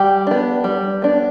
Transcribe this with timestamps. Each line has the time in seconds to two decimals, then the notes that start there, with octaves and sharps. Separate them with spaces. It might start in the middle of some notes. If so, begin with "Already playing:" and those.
Already playing: G3 G4
0.27 B3 D4
0.64 G3
1.02 B3 D4